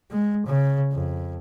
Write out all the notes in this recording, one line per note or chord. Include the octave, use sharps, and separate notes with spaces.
G#3
C#3
F2